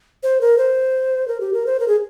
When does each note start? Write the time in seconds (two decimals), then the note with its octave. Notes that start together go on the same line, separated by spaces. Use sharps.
0.23 C5
0.41 A#4
0.58 C5
1.28 A#4
1.40 G4
1.54 A#4
1.67 C5
1.80 A#4
1.88 G#4